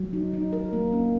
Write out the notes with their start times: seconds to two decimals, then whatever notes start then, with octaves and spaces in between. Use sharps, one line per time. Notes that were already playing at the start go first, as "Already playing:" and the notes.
Already playing: F#3
0.13 D#4
0.33 D#4
0.53 A#4
0.73 A#3
0.92 C#4